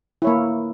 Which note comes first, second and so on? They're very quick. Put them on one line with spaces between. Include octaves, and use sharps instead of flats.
E4 C#5 A#3